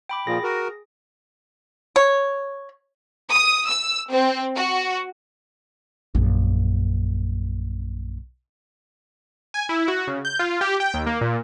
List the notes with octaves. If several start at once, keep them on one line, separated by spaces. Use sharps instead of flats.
G5 B5 D6
A#2 F3 G#4 A#6
F#4 A#4
C#5
D#6
E6
C4
F#4
A#1 F#2
G#5
E4
F#4
C#3
G6
F4
G4
G5
D#2
A#3
A#2